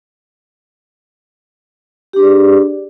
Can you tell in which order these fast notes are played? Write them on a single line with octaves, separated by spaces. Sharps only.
G4 D4 G#4 D5